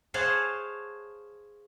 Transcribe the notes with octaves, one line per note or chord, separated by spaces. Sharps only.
G#4 C5 C#5 F5 F#5 A5